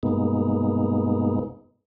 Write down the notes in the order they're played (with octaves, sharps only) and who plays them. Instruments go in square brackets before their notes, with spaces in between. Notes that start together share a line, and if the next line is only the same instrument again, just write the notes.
[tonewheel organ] G2 B2 G#3 A#3 B3 D#4